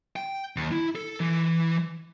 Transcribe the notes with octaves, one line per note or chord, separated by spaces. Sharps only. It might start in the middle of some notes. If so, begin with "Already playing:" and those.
G5
D#2
E4
A4
E3